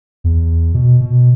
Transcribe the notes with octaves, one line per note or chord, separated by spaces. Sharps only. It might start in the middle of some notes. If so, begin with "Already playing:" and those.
E2
B2
B2